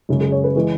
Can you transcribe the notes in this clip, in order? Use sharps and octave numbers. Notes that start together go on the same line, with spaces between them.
F#2 C#3 G#3
G#4
C#5
B4
E3 G#3